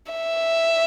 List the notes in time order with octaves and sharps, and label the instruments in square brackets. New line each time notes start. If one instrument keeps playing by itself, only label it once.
[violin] E5